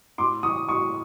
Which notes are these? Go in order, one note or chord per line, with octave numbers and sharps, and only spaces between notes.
A2 C6 D6
E3 C#6 D#6
A2 C#6 D#6